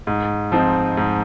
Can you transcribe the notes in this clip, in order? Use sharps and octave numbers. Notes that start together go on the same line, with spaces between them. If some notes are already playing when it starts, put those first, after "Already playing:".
G#2
F3 C4 D#4
G#2